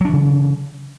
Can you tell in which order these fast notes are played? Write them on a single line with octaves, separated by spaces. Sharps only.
F#3 D4 E3 C#3